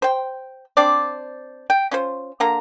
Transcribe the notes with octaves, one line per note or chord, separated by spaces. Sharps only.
C5 G5
C4 D4 C5 D5
G5
C#4 F4 C5
D3 A#3 A#5